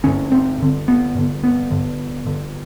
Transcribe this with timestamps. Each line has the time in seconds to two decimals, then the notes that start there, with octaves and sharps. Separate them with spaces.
0.04 G2 D3 C#4
0.32 C4
0.60 G2 D3
0.88 B3
1.15 G2 D3
1.43 B3
1.71 G2 D3
2.26 G2 D3